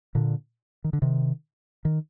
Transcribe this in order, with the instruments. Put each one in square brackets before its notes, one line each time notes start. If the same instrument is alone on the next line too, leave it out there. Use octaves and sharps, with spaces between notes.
[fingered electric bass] A#2 D3
D#3
D3
C3 D#3
D#3